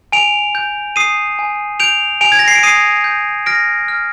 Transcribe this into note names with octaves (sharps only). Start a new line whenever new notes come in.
G#5 D7 F7
G6
D#6 C7 D#7
G#5
G6 D7 F7
G#5 D7 F7
G#6
A#6
C7
D7
D#6 C7 D#7
G6
F6 A#6 D7
F6